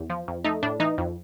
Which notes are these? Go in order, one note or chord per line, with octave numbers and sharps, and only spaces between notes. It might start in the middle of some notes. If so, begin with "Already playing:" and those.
Already playing: E2
F3
F2
A3 D#4
A2 D4
E3 D#4
F2